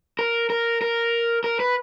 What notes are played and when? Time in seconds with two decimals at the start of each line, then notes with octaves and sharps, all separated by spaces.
0.19 A#4
0.50 A#4
0.82 A#4
1.44 A#4
1.60 B4